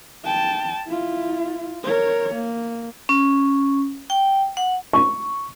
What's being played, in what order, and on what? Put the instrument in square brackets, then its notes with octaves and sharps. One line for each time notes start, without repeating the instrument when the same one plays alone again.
[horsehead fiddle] G5 A5
E4 F4
A#4 C#5
A#3
[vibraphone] C#4
G5
F#5
[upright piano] C#6